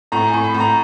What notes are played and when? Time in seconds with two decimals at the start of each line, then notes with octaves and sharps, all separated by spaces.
0.12 A2 A#5
0.27 G#5
0.34 A2
0.44 B5
0.54 A2
0.60 A#5